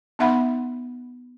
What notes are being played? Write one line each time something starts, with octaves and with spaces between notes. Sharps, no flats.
B3 D#4 E5 F#5 B5